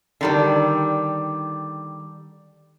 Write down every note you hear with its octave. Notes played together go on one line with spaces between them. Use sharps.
D3 D#3 G3